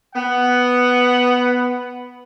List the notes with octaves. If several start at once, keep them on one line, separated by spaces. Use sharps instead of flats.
B3 F#5